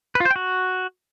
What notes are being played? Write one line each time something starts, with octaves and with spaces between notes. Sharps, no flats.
B4
F4
C5
G5
F#4